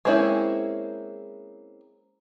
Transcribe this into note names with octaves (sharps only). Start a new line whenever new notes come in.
G#3 A#3 C4 C#4 E4